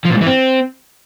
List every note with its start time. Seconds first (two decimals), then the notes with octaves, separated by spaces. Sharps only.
0.05 F3
0.11 A#2
0.16 G#2
0.21 E3
0.27 C4